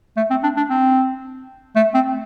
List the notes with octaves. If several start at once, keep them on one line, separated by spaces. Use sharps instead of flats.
A3
C4
D4
D4
C4
A3
C4